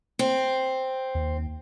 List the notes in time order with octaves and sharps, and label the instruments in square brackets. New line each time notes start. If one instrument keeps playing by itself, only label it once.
[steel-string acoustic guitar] C4
[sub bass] D#2